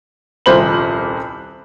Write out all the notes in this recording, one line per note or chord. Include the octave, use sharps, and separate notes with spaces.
D#1 C2 F3 C5 B5 F#7